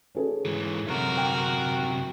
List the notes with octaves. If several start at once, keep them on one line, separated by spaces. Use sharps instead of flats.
C#4 G#4 A4
G#2 E3
F#2 C3 F#4 A#4
G5